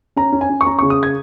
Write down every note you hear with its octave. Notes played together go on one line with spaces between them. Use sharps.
C#4 A#5
C#4
G#5
C#4
C#6
C#4 A#5
C#6
C#3
D#6
G#6